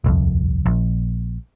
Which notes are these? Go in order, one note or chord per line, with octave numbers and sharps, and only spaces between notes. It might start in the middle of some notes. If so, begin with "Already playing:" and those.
D#1 C2 F2
A#1